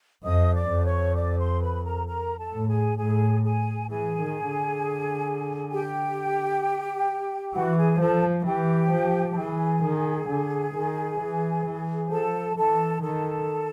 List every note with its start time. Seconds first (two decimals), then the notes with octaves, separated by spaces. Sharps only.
0.24 F2 D#5 D#6
0.54 D5 D6
0.70 F2
0.85 C#5 C#6
1.15 D5 D6
1.38 C5 C6
1.61 B4 B5
1.84 A#4 A#5
2.06 A#4 A#5
2.37 A4 A5
2.53 A2
2.68 G#4 G#5
2.98 A2 G#4 G#5
3.43 G#4 G#5
3.89 E3 G#4 G#5
4.20 D#3
4.50 D3
5.72 G4 G5
7.54 E3 F#4 F#5
7.77 G#4 G#5
8.00 F3 A4 A5
8.46 E3 G4 G5
8.92 F3
9.33 A5
9.37 E3 G#4 G#5
9.83 D#3
10.28 D3
10.75 D#3
11.20 E3
11.66 E3
12.11 F3 A4 A5
12.56 E3 A4 A5
13.02 D#3 A4 A5